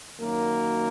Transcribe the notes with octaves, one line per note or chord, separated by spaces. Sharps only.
F#2 D#3 F#3 A#3